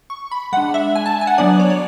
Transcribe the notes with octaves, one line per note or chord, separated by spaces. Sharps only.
C#6
B5
G#3 D4 F#5
E5
G#5
A5
G#5
F#5
F#3 B3 D4 D5
C#5
D5